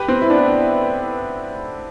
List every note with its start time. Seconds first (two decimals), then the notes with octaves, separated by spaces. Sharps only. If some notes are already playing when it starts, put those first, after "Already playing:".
Already playing: G4 B4
0.08 C4
0.22 E4
0.30 B3 D4